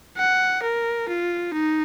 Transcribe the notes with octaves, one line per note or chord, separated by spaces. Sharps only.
F#5
A#4
F4
D#4